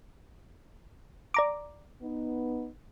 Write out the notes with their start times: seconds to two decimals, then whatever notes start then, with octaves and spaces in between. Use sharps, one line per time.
1.34 D5 A#5 D6
2.01 B3 D#4